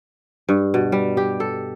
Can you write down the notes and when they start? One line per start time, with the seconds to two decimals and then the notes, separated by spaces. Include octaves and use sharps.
0.49 G2
0.74 B2
0.92 G3
1.17 G4
1.40 A4